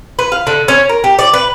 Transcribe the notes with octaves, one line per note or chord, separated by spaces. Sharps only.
B4
F5
D3
C#4
A#4
G4
D5
B4